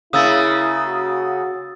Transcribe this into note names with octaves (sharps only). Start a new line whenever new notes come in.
C#3 A#3 E4 D#6 E6 A6
F#4